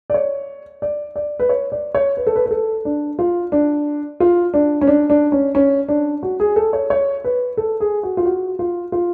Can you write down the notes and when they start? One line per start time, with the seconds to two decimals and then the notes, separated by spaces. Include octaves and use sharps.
0.10 D5
0.14 C#5
0.82 D5
1.16 D5
1.39 B4
1.49 C#5
1.72 D5
1.95 C#5
2.17 B4
2.27 A4
2.36 B4
2.46 B4
2.51 A4
2.85 D4
3.19 F4
3.52 D4
4.20 F4
4.54 D4
4.81 C#4
4.87 D4
5.10 D4
5.32 C#4
5.55 C#4
5.88 D4
6.23 F#4
6.40 G#4
6.56 A4
6.73 C#5
6.90 C#5
7.24 B4
7.57 A4
7.80 G#4
8.03 F#4
8.17 F4
8.25 F#4
8.59 F4
8.92 F4